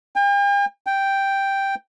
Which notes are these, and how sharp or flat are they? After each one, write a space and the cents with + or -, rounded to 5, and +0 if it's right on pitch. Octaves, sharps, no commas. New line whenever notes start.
G5 +45
G5 +0